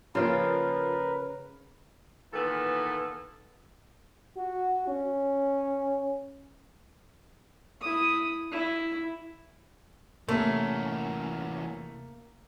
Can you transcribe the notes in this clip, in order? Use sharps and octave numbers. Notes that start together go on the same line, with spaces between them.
C#3 F3 A#3 F4 A#4 B4 G5
A#2 D#3 E3 B3 A4
F#4
C#4
E4 D#6
E4
E2 C3 A3 A#3 C#4